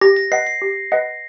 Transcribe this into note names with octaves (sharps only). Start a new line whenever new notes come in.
G4 A#6
A#6
B4 D#5 F#5 C7
C7
G4
B4 D#5 F#5